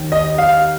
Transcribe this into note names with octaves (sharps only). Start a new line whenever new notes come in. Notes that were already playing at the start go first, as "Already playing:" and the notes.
Already playing: D#2 D#3
D#5
F5